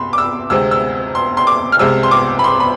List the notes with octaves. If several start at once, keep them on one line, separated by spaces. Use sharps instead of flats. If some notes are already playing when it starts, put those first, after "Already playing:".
Already playing: C2 B5 C6
D6
E6
D2 C3 G#3 C4 E6
E6
C6
C6
D6
F6
C2 C3 G#3 C4 E6
C6
D6
B5
C6
B5